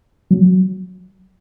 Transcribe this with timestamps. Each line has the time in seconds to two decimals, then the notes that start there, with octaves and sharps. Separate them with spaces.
0.31 F#3